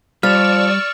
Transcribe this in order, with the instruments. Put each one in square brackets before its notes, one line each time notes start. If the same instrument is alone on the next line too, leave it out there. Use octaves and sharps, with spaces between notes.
[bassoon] F3 [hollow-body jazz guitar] G3 [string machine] D5 C#6 E6 [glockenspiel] F6 A6 F7